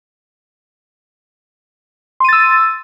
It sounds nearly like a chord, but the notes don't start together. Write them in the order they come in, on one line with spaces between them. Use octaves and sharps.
C6 D#7 A6 E6